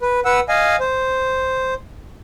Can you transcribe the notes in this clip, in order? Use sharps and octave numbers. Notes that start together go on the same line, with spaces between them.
B4
B4 F#5 E6
D#5 F5 G#5
C5